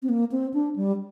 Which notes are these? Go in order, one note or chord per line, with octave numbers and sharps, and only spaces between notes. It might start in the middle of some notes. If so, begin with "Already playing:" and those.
C4
A#3
C4
D4
G3